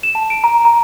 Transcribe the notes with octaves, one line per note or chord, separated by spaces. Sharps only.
E7
A5
D7
A#5
A#5